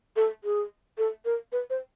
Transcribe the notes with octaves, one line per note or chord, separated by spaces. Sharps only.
A4
G#4
A4
A#4
B4
C5